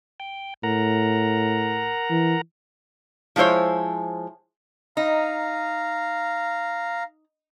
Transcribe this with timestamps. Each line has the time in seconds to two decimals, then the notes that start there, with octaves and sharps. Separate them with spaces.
0.20 G5
0.63 A2 A#4 F#5 A#5
2.10 E3
3.36 F3 G#3 E4 C5 C#5
4.97 D#4 F5 A#5